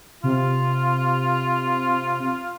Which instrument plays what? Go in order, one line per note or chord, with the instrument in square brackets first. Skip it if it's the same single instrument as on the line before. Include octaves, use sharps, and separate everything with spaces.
[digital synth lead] C3 [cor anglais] F4